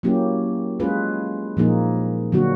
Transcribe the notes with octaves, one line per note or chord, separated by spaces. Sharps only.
F#3 A#3 C#4 E4 G4
G#3 C#4 F4 G#4 B4
A#2 F3 A#3 D#4 G#4
D3 F#3 A#3 D4 F#4